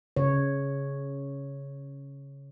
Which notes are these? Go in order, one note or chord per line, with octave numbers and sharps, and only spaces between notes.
C#3 C#5